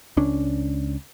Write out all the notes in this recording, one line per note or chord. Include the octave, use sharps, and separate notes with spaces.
C#2 C#4 D4